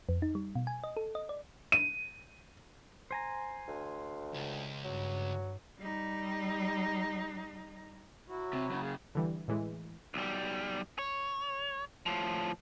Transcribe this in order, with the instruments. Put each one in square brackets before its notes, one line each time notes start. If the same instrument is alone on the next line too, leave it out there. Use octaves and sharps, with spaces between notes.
[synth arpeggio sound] F2
D#4
G3
B2
G#5
D#5
A4
D#5
D5
[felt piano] D#7
[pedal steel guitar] C5 G#5 A#5
[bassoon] D2
[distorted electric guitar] C#2
[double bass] G2 [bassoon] F#3
[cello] G3 D#4
[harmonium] F#3 E4 F#4
[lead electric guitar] C3
F#2 C#3
[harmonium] G#4 F5
[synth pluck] D3 E3 G3
A2 E3 G#3
[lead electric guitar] B1 G3
C#5
A2 F3